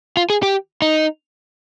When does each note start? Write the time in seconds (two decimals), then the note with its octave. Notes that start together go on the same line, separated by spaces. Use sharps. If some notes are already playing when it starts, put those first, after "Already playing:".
0.17 F4
0.30 G#4
0.43 G4
0.82 D#4